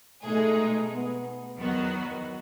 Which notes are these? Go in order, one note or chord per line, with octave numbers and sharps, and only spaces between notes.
B2 G#3 A3 D#4 G#4
B3
E2 D#3 F#3 B3 F#4